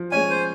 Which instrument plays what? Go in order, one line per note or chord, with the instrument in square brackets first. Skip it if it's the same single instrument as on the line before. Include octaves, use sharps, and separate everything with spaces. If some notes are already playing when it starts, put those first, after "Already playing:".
Already playing: [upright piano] F3
[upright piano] G#3 C#4 [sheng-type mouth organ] G#5
[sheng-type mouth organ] C5